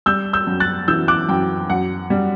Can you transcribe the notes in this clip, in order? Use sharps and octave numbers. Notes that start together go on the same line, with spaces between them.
G3 E6 G6
E6 G6
F#2
F#6 A6
E3 E6 G6
D6 F#6
F#2 G5
F#2 F#5
G3